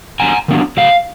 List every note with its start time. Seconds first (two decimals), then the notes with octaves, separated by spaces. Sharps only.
0.20 D#3 F#3 B3 D4 G#5 A#5
0.48 D#3 F#3 B3 D4
0.77 C#3 F#3 A3 F5